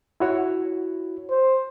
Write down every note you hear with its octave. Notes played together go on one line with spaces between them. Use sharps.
E4 F#4 C#5
C5